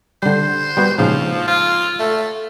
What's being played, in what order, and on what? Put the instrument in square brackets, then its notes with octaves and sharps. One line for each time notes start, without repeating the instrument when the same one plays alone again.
[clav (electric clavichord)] D3 G3 [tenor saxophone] C5
[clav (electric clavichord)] G3 B3 F#4
[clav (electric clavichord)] A#1 G#2 C#3 [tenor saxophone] F3
[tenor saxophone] F4
A3